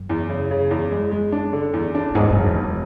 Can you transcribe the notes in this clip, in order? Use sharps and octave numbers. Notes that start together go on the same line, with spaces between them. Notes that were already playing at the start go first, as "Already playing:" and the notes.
Already playing: F#2
E2
C#3
C#3
E2
G#3
G#3
D4
D3
E2
D4
F#2
E1 G#2
E1 F#2
E2
E1